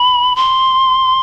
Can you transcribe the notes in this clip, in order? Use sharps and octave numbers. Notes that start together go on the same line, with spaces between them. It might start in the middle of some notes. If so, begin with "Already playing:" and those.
Already playing: B5
C6